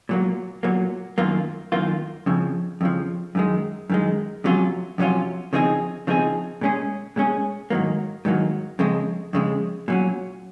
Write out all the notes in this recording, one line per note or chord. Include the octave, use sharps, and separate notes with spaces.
A#2 F#3 A#3
A#2 F#3 A#3
F#2 D#3 A#3 F4
F#2 D#3 A#3 F4
F2 C#3 F3
F2 C#3 F3
F#2 D#3 G#3
F#2 D#3 G#3
F2 C3 F#3 C#4 F4
F2 C3 F#3 C#4 F4
C#3 F3 C4 D#4 G#4
C#3 F3 C4 D#4 G#4
A#2 G#3 C#4 G#4
A#2 G#3 C#4 G#4
G#2 D#3 F#3 A#3
G#2 D#3 F#3 A#3
F2 C#3 G#3
F2 C#3 G#3
A#2 F#3 C#4